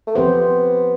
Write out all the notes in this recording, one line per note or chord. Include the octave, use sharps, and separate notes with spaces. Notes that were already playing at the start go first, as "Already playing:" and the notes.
A3
F3 B3 C4 G4 C5